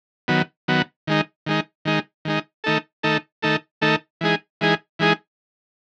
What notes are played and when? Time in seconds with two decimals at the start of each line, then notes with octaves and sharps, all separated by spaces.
0.28 D#3 F#3 B3
0.68 D#3 F#3 B3
1.07 D#3 G#3 D#4
1.46 D#3 G#3 D#4
1.85 D#3 G#3 D#4
2.25 D#3 G#3 D#4
2.64 D#3 A3 D#4 A4
3.03 D#3 A3 D#4 A4
3.43 D#3 A3 D#4 A4
3.82 D#3 A3 D#4 A4
4.21 E3 G#3 D#4 G#4
4.61 E3 G#3 D#4 G#4
4.99 E3 G#3 D#4 G#4